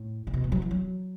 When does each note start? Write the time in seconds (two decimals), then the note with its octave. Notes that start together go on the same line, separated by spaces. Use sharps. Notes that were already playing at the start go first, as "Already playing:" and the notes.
Already playing: A2
0.27 C#3
0.34 B2
0.44 A2
0.52 F#3
0.62 E3
0.71 F#3